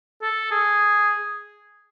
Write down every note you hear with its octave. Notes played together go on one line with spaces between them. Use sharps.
A4
G#4